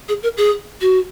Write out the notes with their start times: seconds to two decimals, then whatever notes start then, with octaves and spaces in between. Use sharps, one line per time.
0.09 G#4
0.23 A#4
0.37 G#4
0.81 F#4